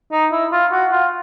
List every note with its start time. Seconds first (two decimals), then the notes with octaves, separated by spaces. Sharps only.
0.12 D#4
0.32 E4
0.52 F4
0.72 F#4
0.92 F4